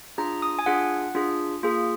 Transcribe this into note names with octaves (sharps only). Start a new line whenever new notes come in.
D4 F4 G#4 A#5
D#6
G#5
D4 F4 G#4 F#5
D4 F4 G#4
A#3 F4 G#4